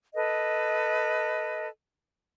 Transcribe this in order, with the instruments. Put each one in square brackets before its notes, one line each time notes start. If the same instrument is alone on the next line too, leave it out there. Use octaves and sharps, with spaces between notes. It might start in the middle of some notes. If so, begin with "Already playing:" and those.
[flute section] A4 B4 D#5